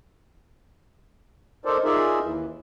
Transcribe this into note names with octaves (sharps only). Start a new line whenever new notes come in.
D#4 A4 A#4 C5 D5
D#4 F4 G#4 A#4 D5 E5
D#2 E3